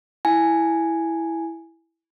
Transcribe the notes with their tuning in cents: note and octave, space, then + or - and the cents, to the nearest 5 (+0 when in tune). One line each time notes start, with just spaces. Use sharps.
E4 +0 G#5 +0